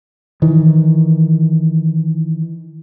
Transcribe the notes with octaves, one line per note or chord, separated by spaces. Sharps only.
D#3 E3